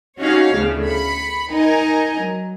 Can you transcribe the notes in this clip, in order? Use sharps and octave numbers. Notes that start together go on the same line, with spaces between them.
C#4 D#4 F#4 G4 C#5 F5
D2 A2 C#3 B3
B5 C#7
D#4 A#4 D#5 G#5 A#5
F#3